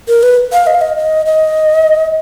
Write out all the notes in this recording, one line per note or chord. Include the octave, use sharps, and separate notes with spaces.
A#4
B4
F5
D#5
F5
D#5
D#5
D#5